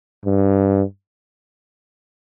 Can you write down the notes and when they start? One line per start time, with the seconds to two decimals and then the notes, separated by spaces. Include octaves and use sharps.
0.25 G2